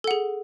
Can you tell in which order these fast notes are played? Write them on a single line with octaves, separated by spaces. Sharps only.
A4 F#5 G#4